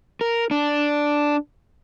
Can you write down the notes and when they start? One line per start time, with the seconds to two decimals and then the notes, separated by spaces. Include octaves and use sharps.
0.21 A#4
0.51 D4